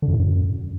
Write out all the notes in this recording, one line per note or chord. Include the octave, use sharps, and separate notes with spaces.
D3
F#2
A2
F#2